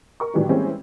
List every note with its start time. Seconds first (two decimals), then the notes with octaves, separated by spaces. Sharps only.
0.20 A#4 C#6
0.34 A2 D#3 E3 F#3 D4 G4
0.49 E3 G3 G#3 A#3 C4 C#4